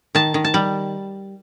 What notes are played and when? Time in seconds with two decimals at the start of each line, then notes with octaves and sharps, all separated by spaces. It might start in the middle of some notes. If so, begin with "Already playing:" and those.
0.15 D#3 A5
0.34 D#3
0.44 A5
0.54 G3